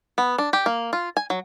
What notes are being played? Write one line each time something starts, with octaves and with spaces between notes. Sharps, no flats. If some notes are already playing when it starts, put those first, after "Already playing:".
B3
D4
G4
A#3
F4
G#5
F#3